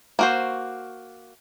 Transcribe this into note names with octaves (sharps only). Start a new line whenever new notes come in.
A#3 F#4 C5